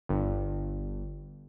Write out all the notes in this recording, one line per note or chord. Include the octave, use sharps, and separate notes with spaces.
G1